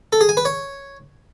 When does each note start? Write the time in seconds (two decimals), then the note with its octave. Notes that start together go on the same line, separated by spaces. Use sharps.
0.13 A4
0.21 G#4
0.29 G#5
0.37 B4
0.45 C#5